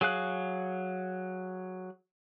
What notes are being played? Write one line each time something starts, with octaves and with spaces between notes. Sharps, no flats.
F#3 G#4 F5 F#6